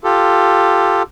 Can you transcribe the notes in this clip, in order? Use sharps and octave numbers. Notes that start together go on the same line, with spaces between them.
F4 G4 A4